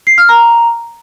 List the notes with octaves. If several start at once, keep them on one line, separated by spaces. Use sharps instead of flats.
C7
F6
A#5